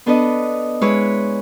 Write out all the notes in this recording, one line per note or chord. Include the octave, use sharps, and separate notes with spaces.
B3 D4 A4 B4 D#5
G#3 E4 B4 C#5